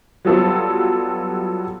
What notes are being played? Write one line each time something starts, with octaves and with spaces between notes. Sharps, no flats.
F#3 G3 B3 F4 A4